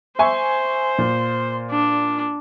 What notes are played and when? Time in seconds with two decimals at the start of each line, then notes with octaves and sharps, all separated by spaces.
0.19 C5 E5 G#5 C#6
0.98 A#2
1.71 D4